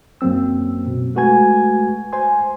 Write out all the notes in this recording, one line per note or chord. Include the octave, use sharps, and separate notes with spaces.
F#2 F#3 A#3 C4 E6
B2
G#3 A3 F#4 B4 G#5 G#6
C5 G#5 C6